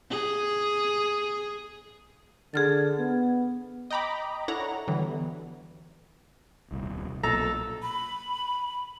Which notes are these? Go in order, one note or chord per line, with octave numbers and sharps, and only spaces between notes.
G#4
D3 G#4 F6 A6
B3
D#5 G5 A#5 B5 D6
D4 E4 A4 C#5 F#5 A#5
D3 E3 F#3 G3 B3
D#1 C2
B1 A#2 A4 A#5
B5